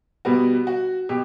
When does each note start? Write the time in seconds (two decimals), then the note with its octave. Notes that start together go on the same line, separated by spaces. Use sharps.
0.25 B2 G3 B3 F#4
0.67 F#4
1.09 B2 G4